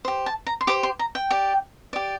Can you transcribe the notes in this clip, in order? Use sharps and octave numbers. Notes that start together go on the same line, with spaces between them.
G4 C5
A5
A#5
C6
G4 C5 D6
C6
A#5
G5
G4 D5
G4 D5